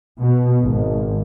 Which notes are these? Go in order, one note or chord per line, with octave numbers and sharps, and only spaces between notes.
B2
G#1